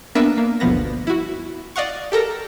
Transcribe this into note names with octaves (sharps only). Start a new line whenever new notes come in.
A#3 B3 D4 A#4 B4 E5
A#3
G1 D2 B2 F3 B3 A#6
E4 F#4
D5 D#5 F5 F#5 C#6
G4 A4 A#4 A#5